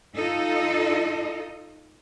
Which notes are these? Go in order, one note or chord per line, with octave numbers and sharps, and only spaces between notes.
D#4 F4 A4 D#5